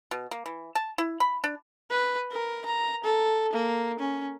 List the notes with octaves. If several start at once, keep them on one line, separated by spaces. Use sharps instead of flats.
B2
A#3
E3
A5
E4
B5
D4
B4
A#4
A#5
A4
A#3
C#4